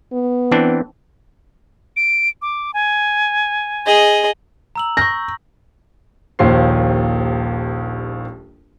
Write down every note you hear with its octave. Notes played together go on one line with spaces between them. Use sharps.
B3
E3 C4 D4
D7
D6
G#5
G#4 D#5
A#5 E6 F#7
C#6 G6 A#6
D#1 A#1 D#2 F4 C5 C7